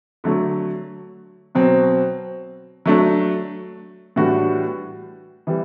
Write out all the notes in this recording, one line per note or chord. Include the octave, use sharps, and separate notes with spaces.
D3 F#3 A3
B2 F#3 C4
F#3 A3 D4
A2 E3 G3 D4 F#4
E3 G3